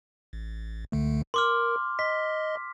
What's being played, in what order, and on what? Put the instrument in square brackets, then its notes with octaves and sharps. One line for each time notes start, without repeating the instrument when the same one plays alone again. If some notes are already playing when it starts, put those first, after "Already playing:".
[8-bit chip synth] A1
C#2 D3 A3
[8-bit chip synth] A#4 [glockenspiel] C6 D6 F6
[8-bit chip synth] D#5 C6 [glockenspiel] B6